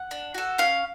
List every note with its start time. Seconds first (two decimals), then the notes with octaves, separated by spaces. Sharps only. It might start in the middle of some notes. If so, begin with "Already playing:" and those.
Already playing: F#5
0.11 D4
0.35 F#4 A4
0.58 C#4 F5